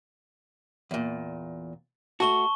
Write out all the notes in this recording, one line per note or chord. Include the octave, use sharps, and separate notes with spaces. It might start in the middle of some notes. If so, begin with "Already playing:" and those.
E2 A#2
A3 F#4 A5 C#6 G7